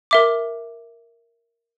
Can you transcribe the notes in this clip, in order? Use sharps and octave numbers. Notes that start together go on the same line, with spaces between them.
A#4 E5 D6